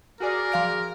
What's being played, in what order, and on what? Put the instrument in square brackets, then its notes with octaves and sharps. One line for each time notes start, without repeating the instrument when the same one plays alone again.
[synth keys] F#4 G#4 D5 [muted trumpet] A#4
[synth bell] F3 F5 D7